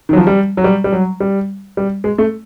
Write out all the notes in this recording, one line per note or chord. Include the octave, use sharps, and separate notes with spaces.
D#3
F#3
F3
G3
F#3
G3
G3
F#3
G3
G3
G#3
A3